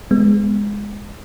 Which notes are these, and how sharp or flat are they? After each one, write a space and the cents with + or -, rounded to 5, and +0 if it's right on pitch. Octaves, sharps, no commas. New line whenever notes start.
G#3 -10 B3 +0